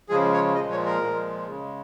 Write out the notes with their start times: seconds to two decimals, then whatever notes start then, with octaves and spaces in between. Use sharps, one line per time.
0.09 C#3 F3 G#3 G#4
0.33 C#5
0.55 A#2 F3 G#3 D#5
0.71 C#5
0.86 A#4
1.01 A#2 F3 G#3
1.48 C#3 G#3